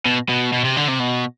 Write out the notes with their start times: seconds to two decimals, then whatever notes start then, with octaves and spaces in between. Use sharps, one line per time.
0.06 B2
0.29 B2
0.53 B2
0.65 C3
0.77 D3
0.89 C3
1.00 B2